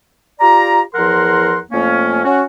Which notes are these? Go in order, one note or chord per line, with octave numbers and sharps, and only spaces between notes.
F4 G4 D5 A#5
E2 F3 A#4 F#5 A#5 C6
F2 A3 A#3 C#4
C#4 F#4